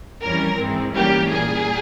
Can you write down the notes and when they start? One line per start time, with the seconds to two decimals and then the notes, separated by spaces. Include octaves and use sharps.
0.22 F2 E3 G3 C#4 A#4
0.58 G#2 E3 G#3 C4
0.94 G#2 E3 G3 A#3 C#4 G4
1.30 A#2 G3 A#3 G#4